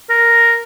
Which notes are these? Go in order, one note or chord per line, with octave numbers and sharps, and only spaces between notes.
A#4